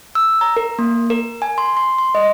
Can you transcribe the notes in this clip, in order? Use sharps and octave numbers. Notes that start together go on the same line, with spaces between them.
E6
A#5
A#4
A#3
A#4
G#5
C6
C6
C6
D#5